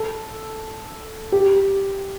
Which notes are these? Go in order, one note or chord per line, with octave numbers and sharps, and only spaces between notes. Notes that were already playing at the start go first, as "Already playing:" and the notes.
Already playing: A4
G4